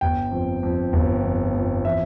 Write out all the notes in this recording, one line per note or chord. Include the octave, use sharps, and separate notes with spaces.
G1 G5
F2
F2
G1
F2
F2
E3 E5